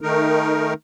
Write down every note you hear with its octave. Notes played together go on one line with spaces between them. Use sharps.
D#3 A3 D#4 A#4